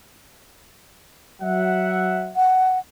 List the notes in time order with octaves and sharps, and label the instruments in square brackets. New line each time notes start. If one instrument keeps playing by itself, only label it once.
[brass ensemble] F#3 E5 F#5
[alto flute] F#5